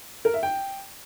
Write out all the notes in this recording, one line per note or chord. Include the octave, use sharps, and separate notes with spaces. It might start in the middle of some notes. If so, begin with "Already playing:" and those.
A#4
E5
G5